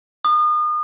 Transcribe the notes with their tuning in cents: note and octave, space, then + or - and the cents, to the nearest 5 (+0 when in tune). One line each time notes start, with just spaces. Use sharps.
D#6 -35